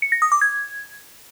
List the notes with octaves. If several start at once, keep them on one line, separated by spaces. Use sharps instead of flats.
C#7
A#6
D#6
D6
G#6